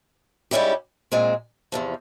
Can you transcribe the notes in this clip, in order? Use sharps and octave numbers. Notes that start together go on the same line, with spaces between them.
G#2 G3 C#4 E4 G4
A#2 G#3 C4
E2 C3 F3